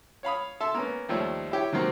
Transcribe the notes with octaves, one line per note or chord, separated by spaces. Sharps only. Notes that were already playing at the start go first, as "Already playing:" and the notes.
C#5 F5 B5 D#6
A4 E5 A5 C6
A#3 B3 C#4
D#2 F3 G3 A3 C#5
E4 G4 C#5
C3 D#3 F#3 A#3 C4